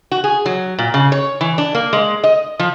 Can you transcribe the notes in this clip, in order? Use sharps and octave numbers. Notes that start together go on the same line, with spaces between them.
F#4
G#4
F#3
A#2
C#3
C#5
E3
D4
A#3
G#3
D#5
F3